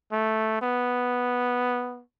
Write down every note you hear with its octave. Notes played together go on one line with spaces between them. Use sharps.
A3
B3